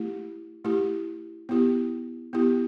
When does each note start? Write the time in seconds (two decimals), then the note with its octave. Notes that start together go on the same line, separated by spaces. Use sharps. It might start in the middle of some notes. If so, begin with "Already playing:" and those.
Already playing: A3 E4 G4
0.65 A3 E4 G4
1.49 B3 E4 G4
2.33 B3 E4 G4